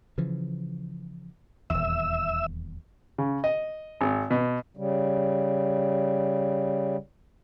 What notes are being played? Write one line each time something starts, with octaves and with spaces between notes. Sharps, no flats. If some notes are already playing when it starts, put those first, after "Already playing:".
C#3 E3 F3
D#1 E2 E5 E6
C#3
D#5
G#1
B2
C#3 G3